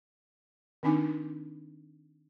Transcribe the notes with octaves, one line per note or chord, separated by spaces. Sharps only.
D#3 C4 D4 D#4 G#5 D6